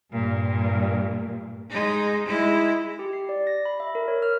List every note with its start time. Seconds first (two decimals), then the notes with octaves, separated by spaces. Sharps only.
0.11 G2 A#2
1.70 G#3 D#4
2.27 G#3 E4
2.99 G4
3.13 C7
3.29 D5
3.47 A#6
3.65 B5
3.80 E5
3.95 A#4
4.08 C#5
4.22 F6